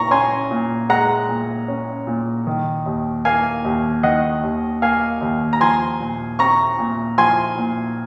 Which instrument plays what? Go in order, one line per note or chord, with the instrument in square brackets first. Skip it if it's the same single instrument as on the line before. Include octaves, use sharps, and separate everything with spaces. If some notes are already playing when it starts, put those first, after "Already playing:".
Already playing: [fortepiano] A#2 A#5 C#6
C#4 G#5 C6
A#2
G#3 F#5 A#5
A#2
C#4
A#2
D#3
D#2
A#3 F5 G#5
D#2
D#3 D#5 F#5
D#2
A#3 F5 G#5
D#2
A#5
F3 G#5 C6
A#2
C4 A#5 C#6
A#2
F3 G#5 C6
A#2